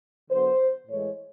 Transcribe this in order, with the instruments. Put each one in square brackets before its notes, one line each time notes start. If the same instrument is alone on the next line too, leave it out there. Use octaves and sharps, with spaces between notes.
[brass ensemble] D3 F#3 B3 C5
A2 E3 G#3 C#5